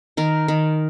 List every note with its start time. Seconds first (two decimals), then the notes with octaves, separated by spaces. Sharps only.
0.17 D#3 A#4
0.48 D#3